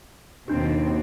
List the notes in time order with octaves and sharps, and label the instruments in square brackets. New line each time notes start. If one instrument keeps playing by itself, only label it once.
[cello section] D#2 B2 C4 [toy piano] D4 G4